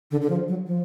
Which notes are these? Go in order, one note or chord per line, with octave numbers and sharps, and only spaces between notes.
D3
D3
F3
F#3
F3